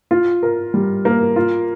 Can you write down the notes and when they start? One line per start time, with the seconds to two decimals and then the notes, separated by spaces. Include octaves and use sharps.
0.11 F4
0.43 A#4
0.74 G3
1.05 A#3
1.36 F4